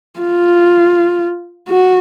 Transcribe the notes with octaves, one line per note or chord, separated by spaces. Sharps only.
F4
F#4